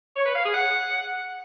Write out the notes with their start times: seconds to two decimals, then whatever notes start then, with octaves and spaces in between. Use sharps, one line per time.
0.17 C#5
0.26 B4
0.36 F5
0.45 G#4
0.54 F#5